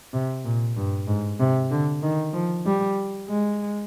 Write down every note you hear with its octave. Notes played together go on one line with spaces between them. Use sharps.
C3
A#2
G2
G#2
C3
D3
D#3
F3
G3
G#3